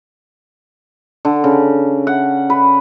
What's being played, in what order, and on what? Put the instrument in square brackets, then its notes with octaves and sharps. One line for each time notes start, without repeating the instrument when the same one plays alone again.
[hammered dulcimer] D3
C#3
F#5
B4